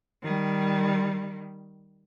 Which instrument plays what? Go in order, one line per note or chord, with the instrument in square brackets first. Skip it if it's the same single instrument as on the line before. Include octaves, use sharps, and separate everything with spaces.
[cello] D#3 G3